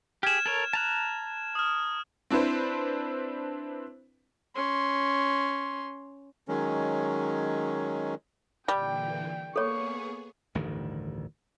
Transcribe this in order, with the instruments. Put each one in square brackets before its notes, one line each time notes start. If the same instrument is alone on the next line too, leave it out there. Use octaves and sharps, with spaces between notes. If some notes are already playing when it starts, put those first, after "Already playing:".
[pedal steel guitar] G4 G#4 [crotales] F6 G#6 E7
[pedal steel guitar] A4 A#4 C#5
A5 A#5 F#6
[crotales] D#6 F6
[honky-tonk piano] C4 D4 E4 B4 C5
[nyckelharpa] C#4 C6
[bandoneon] D#3 F#3 G#3 C#4
[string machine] A#2 D3 E3 [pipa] G3 [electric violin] G5
[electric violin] A#3 C#6 [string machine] B3 G#4 [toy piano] A4 C#5
[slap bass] A1 D2 G2 D#3